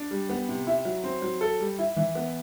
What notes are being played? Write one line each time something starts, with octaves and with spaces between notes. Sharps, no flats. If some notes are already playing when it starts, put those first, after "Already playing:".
Already playing: D4
G3
B3
C3
E4
F#3
C4
F#3
A4
G3
E4
E3
B3